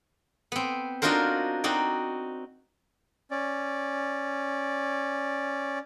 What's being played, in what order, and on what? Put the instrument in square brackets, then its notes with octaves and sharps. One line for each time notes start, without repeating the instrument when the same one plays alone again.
[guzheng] B3 C4
D4 D#4 F4 F#4 A#4 C5
C4 D#4 F#4 D5
[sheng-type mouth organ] C#4 D5